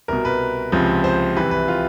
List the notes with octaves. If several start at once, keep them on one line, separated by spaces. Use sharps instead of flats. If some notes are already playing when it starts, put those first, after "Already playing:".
C2 B2 A#4
B4
C#2 C3 F3
C5
C2 C3 E3 B4
B4
F4